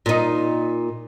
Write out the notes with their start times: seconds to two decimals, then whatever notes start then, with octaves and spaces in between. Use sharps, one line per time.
0.06 A#2 D#4